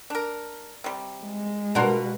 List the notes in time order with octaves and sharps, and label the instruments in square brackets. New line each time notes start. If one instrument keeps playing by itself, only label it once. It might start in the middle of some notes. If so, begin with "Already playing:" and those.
[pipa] D4 A#4
C3 G3
[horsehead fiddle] G#3
[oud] B2 A#4 [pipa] D4 F#5 C6 [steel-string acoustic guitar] F4 F#4 B4